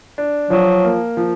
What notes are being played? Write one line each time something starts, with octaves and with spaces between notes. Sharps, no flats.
D4
F3 F#3
A#3
F3